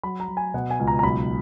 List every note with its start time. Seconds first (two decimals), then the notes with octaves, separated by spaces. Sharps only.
0.03 F#3 B5
0.20 A#5
0.28 F#3
0.37 G#5
0.54 B2 F#5
0.70 G#5
0.79 C#2
0.87 A#5
0.99 A#5
1.03 B1 B5